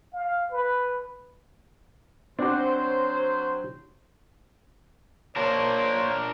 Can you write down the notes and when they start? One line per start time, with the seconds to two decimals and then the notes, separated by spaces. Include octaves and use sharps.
0.13 F5
0.52 B4
2.39 F#3 C4 D4 F#4 C5
5.36 A#3 D4 A#4 C5 C#5